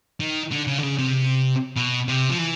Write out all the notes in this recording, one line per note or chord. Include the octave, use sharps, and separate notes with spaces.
D#3
D3
C#3
D3
C#3
C3
B2
C3
F3
E3